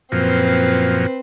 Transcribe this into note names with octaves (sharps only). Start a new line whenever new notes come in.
F#2 A#2 F3 C4 B4